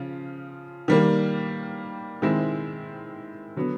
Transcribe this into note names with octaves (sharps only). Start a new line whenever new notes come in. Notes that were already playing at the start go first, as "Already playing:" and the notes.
Already playing: C#3 F3 F4
D#3 G3 A#3
D#3 G#3 C4 E4
D3 F#3 B3